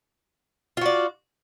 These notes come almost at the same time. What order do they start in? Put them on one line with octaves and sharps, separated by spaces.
F4 F#4 D5